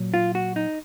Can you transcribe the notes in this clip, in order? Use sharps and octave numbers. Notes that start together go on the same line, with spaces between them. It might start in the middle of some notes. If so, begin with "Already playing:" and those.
Already playing: A#2 F#3
F4
F#4
D#4